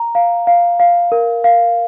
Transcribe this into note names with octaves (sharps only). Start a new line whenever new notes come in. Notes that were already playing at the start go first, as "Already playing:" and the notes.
Already playing: A#5
F5
F5
F5
A#4
F5